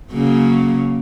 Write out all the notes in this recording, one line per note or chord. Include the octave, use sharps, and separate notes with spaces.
C#3 F#3 A#3